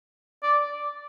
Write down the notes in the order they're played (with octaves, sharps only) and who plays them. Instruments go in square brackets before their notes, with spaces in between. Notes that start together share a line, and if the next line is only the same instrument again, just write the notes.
[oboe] D5